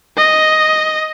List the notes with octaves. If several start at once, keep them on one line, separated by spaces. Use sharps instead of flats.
D#5